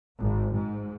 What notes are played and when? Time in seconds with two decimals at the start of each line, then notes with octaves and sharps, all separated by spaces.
0.19 G#1
0.55 G#2